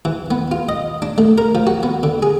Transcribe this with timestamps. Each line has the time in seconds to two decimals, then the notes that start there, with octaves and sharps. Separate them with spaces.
0.05 E3
0.31 B3
0.51 F4
0.69 D#5
1.02 D4
1.18 A3
1.38 A#4
1.55 F3
1.67 F#4
1.83 B3
2.03 D3
2.23 G#4